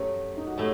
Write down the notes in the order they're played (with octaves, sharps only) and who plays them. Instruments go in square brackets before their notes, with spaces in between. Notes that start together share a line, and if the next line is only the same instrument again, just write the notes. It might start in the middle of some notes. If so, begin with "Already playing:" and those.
Already playing: [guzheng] F#2 F#3 A3 [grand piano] G4
[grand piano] D#4
F#4
[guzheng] A2 A3 [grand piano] G4